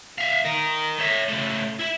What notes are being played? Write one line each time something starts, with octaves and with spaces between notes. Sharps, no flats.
E5 F5
A#4 D#5
C#5 E5
C#3 A3
E4 E5